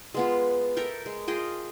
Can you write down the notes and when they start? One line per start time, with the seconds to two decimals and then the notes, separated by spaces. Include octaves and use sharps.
0.14 G#3 B3 F4
0.77 A4 A#4 E5 G5
1.06 G#3
1.28 F4 G#4 D#5 G5